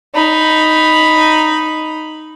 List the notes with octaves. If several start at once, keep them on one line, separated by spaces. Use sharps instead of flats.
D#4 B5